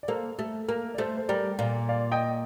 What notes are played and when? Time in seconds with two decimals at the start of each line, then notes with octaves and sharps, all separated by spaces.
0.03 D5
0.08 A#3 A4 C5
0.39 A3 A4
0.68 A#3 A#4
0.94 D5
0.98 A3 A4 C5
1.17 C5
1.29 G3 A#4 D5
1.59 A#2 D5 F5
1.89 D5 F5
2.11 D#5 G5